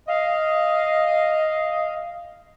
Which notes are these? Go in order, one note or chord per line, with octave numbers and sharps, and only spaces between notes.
D#5 F5